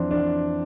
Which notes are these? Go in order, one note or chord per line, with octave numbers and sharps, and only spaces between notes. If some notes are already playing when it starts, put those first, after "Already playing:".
Already playing: F2 E3 C4 D4
E3 D4